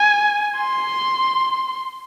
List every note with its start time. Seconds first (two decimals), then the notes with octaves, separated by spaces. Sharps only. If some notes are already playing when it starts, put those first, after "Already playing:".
Already playing: G#5
0.57 C6